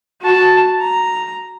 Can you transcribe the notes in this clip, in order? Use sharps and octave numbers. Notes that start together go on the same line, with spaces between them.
F#4 A5
A#5